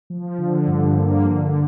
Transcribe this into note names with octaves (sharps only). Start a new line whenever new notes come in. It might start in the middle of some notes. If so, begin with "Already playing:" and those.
F3
D3
G2
A#3
D3